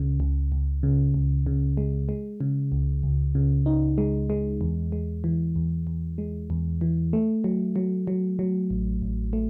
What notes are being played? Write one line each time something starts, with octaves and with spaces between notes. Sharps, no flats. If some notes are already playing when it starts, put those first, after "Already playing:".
Already playing: C#2 C#3
C#2
C#2
C#3
C#2
C#3
G#3
G#3
C#3
C#2
C#2
C#3
D#4
G#3
G#3
E2
G#3
E3
E2
E2
G#3
E2
E3
A3
F#3
F#3
F#3
F#3
A1
A1
A3